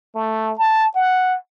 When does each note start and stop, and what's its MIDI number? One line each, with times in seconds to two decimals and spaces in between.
0.15 0.53 57
0.59 0.88 81
0.95 1.36 78